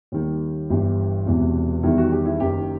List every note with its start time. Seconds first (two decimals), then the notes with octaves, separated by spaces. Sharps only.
0.12 D#2 D#3 G3
0.70 G1 G2 E3 G3
1.26 E1 E2 C3 E3
1.83 E2 D#3 G3 E4
1.98 F#4
2.12 G4
2.26 E4
2.40 F#1 F#2 D#3 G4